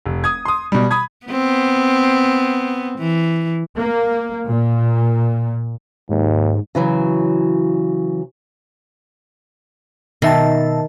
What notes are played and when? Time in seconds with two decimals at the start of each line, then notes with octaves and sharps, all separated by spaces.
0.06 F1
0.24 D#6 G#6
0.45 C6 D#6
0.72 B2 G3
0.91 B5 D#6 G#6
1.27 B3 C4
2.99 E3
3.78 A#3
4.50 A#2
6.09 D#2 G#2
6.75 C#3 E3 F#3
10.22 B2 D#3 E5 A5